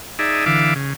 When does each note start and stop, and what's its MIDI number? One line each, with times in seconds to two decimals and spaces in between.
0.19 0.45 63
0.19 0.45 68
0.19 0.45 74
0.19 0.45 76
0.46 0.74 50
0.46 0.74 52
0.46 0.74 76
0.46 0.74 77
0.46 0.74 86
0.75 0.93 49